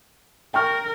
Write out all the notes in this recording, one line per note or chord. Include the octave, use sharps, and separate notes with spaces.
A#4 G5 C#6 F6